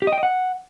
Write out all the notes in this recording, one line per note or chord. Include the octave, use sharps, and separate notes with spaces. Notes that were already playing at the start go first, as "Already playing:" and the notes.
G4
D#5
G5
D#5
F#5